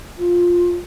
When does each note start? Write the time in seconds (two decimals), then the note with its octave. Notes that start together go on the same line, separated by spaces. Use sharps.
0.18 F4